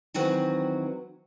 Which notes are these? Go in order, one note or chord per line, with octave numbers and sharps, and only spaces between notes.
D#3 E3 F#3 C4 F#4 B4